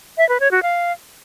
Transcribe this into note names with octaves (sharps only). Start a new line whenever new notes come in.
E5
B4
C#5
F#4
F5